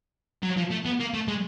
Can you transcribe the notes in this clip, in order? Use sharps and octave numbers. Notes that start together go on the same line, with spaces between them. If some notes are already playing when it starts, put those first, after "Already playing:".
F#3
F3
A3
B3
A#3
A3
G#3